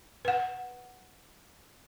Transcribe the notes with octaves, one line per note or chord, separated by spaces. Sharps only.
B4 F#5